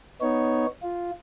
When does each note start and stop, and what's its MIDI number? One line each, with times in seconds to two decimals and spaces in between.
0.21 0.66 59
0.21 0.66 63
0.21 0.66 73
0.83 1.11 65